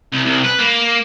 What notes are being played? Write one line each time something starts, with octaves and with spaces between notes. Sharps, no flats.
C2
C2
B4
A#3